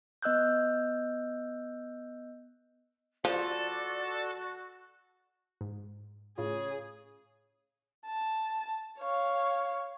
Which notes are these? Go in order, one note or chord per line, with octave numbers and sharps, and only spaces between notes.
B3 D#5 E6 F#6 G6
F3 F#4 A4 D5
G#2
A2 C#3 F4 G#4
A5
C#5 F5